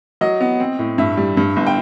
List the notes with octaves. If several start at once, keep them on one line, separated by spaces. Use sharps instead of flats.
F#3 D#5
B3
C4
A2
G2 E5
G3
G2
G1
G5